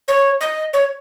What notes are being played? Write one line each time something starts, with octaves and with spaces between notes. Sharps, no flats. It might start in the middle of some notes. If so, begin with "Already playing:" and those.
C#5
D#5
C#5